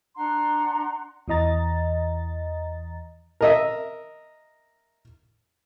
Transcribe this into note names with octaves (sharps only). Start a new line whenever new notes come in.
D4 F#5 A#5 C6
E2 E3 D#5 A#5 A6
A#4 D#5 E5